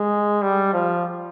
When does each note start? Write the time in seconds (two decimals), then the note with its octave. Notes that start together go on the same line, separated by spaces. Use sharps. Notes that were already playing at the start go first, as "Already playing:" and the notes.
Already playing: G#3
0.42 G3
0.73 F3